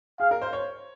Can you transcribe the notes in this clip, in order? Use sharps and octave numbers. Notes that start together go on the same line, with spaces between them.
G#4 F5
A#4
C5
C#5